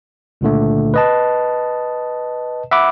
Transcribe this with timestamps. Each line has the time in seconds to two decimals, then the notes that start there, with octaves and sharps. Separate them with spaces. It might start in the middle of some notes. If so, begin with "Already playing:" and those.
0.41 C#2 A#2 D3 A3
0.94 B4 D#5 A5
2.71 E5 F#5 B5 D6